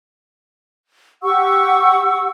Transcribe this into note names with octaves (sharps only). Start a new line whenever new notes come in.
G4 F#5 C#6 E6